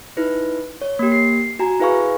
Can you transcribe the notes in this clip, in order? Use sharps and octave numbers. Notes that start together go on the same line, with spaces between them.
D#4 E4 B4
C#5
A#3 G4
C7
F#4 G#5 A#5
E4 G#4 B4 F5 G#5 C#6